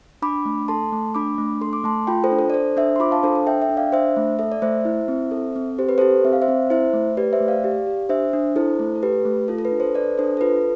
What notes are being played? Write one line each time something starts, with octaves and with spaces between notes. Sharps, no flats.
D4 B5 D6
A3
A4 A5 C6
A3
D4 B5 D6
A3
A4 C6
D6
A3 A5 C6
F4 G5 B5
A4 C5
D4
A4
D5
A4 C5
D4 C5 E5
C6
F4 B5 D6
F5 A5
D4 A4 C5
A4
A4 E5 G5
E5 G5
D4
D5 F5
D4 C5 E5
A3
A4 E5
D5
A3 C5 E5
E4
C4
A4
C4
G4 C5
B4
G4 A4 C5
C4 E5
F5
C5 E5
C4
E4 C5 E5
A3
G4 B4 D5
C5 E5
A3
D5 F5
G4
G4
D4 C5 E5
D4
E4 A4 C5
A3
A4
G4 B4
A3
F4 A4
A4
B4
D4
A4 C5
A4 B4 D5
D4 A4 C5
A4
F4 B4